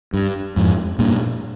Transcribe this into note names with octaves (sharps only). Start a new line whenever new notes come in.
G2
F2 G#2
G2 A#2